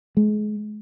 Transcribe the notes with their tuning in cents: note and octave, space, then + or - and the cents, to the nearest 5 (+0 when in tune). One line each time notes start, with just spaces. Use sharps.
G#3 +30